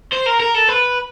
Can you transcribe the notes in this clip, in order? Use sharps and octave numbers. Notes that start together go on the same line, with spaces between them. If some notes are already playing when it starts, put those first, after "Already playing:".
C5
A#4
A#4
A4
B4